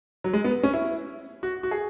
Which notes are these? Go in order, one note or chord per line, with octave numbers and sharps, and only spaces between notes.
F#3
G#3
B3
C#4
E4
F#4
F#4
G#4